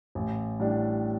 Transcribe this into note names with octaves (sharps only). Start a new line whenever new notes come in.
A1
A2 G3 D4